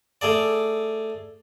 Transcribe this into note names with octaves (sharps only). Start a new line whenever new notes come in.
A3 G#4 D5